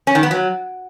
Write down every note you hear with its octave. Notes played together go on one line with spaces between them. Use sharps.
C#4
D#3
B3
F#3